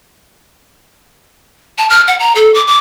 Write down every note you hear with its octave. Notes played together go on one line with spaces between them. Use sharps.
A5
F6
F#5
A#5
A4
D6
D6